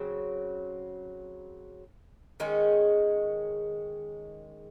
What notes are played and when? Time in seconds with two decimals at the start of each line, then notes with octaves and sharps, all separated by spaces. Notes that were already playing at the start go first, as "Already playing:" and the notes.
Already playing: C#3 F#3 C4
2.40 D#3 G#3 C#4 G#4